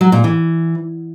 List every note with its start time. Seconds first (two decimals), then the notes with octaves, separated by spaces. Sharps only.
0.01 F#3
0.12 A#2
0.24 E3